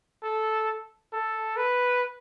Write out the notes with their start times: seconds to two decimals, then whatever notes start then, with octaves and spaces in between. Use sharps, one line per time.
0.23 A4
1.13 A4
1.57 B4